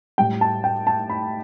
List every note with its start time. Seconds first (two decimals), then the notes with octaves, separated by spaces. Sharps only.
0.18 A2 G3 G5
0.41 A5
0.64 G5
0.87 A5
1.10 B5